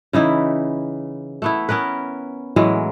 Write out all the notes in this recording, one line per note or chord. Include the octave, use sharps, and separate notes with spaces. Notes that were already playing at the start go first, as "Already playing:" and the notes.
C#3 E3 D#4 E4
A3 B3 E4
B3 C#4 A#4 B4
A2 E3 F#3 G#3